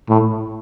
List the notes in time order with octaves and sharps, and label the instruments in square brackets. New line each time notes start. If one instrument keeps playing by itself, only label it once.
[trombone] A2